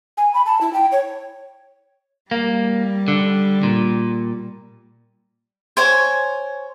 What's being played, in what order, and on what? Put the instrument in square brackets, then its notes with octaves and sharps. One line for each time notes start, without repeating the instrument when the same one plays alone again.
[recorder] G#5
B5
A5
E4
G5
C#5
[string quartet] G3 [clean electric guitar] A#3
[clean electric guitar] D3
A#2
[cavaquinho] C5 C#5 G#5